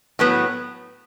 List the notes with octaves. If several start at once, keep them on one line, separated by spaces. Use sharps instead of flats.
A2 F#3 B3